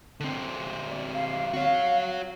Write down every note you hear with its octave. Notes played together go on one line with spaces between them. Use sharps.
D3 C4
D5
F5
F#4 C#5 F5